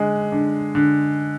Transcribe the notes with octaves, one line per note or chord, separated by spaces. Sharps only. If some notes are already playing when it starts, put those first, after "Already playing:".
Already playing: D3 G#3
D3
D3